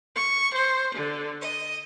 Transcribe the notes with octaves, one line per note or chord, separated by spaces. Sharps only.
C#6
C5
D3
D#5